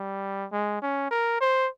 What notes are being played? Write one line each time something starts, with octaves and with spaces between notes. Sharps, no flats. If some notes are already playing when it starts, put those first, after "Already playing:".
Already playing: G3
G#3
C#4
A#4
C5